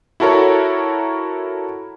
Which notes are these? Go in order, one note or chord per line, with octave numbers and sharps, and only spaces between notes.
E4 F#4 A4 A#4 C#5